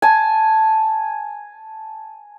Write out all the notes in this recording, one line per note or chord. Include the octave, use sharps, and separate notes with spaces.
G#5 A5